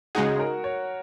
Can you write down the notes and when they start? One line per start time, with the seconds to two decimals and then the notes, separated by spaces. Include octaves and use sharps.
0.15 C#3 G#3 D#4 F#4 G#4
0.40 A#4
0.64 C#5